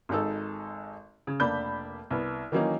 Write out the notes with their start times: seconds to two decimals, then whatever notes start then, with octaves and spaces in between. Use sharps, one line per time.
0.09 G#1 G#3 D#4 A4
1.27 C#3
1.40 F1 A#3 D4 B5 G6
2.10 C2 B3
2.52 D#3 E3 F#3 A#3 C#4 D#4